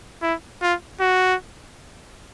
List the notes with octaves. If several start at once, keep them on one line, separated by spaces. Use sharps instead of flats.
E4
F4
F#4